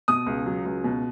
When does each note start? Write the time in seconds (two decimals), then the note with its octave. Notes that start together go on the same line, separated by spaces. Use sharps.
0.08 B2 D#6
0.26 C#2
0.46 F#3
0.65 C#2
0.84 B2